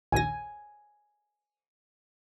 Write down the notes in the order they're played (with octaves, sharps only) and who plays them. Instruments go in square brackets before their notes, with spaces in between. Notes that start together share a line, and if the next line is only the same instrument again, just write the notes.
[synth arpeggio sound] A#1 D#2 A#6 [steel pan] G#5